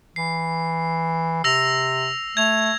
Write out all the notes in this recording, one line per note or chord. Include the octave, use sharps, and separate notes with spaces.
E3 C7
C3 E6 A#6 F7
A3 G#6 F7